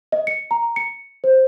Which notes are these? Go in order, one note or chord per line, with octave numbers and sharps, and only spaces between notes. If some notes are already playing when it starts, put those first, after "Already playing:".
D#5
C#7
A#5
C#7
C5